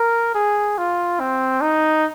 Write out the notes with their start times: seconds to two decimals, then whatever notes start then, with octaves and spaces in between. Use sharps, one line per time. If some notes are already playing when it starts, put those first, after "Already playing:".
Already playing: A#4
0.34 G#4
0.78 F4
1.20 C4
1.61 D#4